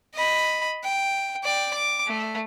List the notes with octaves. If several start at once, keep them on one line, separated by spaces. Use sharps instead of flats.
D#5 B5
G5
D5 G5
D6
A3